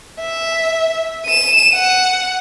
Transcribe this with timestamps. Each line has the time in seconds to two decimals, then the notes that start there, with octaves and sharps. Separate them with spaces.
0.20 E5
1.26 D#7 E7
1.73 F#5